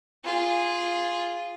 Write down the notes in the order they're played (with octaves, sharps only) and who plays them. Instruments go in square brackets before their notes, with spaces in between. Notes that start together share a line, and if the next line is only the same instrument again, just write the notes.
[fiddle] F4 G#4